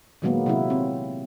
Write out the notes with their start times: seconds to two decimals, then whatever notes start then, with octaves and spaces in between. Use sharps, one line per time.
0.22 A#2 D#3 F#3 G#3 A#3 B3
0.46 C3 F#3 E4
0.70 C4